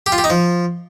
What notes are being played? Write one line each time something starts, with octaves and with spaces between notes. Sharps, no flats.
G4
F4
G4
D#4
F3